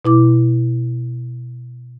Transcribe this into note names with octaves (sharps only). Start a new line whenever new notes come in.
B2 E4 D6